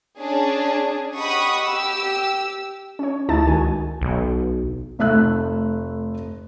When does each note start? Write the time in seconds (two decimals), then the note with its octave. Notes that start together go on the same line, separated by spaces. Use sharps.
0.20 C#4 D4 G#4
1.17 G4 D#5 F#5 B5 C#6 D#6
1.64 G4 E6
2.99 C#4 C#5
3.29 D2 D#4 E4 A5 A6
3.47 C#2 D#3 F#4 G#5
4.01 B1
4.99 F1 A3 E5 E6 F#6